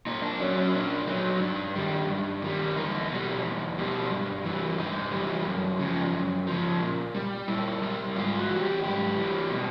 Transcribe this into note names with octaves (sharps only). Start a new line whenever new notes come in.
A#2 D#4
D4
F#3 C#4
C#4
A#2 D4
F#3 D#4
G2 D4
D#3 G3
G2
D#3 G3
E2 D#4
B2 G3
E2
B2 G3
G2
E3 G3
G2 D#4
E3 G3
F#2
C#3 F3
F#2
C#3 F3
A#2
G3
A#2 E4
G3
G#2 F4
F#4
E3 G3
G4
G#2 G4
E3 G3
B2